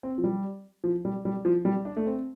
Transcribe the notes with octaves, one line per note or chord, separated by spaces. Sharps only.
C4
F3
G3
F3
G3
G3
F3
G3
D4
A3
C4